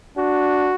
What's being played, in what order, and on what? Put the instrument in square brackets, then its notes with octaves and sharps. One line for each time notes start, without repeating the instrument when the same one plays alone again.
[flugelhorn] D4 [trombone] F#4